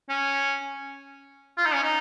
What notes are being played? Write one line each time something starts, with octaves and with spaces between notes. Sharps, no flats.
C#4
F4
D#4
C#4
D#4